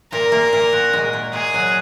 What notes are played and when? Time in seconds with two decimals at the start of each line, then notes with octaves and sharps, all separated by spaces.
0.12 A#2 A#4
0.32 A#3
0.53 A#2
0.73 F#4
0.93 G#3
1.13 A#2
1.33 A#2 G#4
1.54 F#3